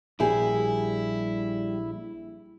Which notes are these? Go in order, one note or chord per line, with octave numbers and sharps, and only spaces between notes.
A#1 G3 E4 G4 G#4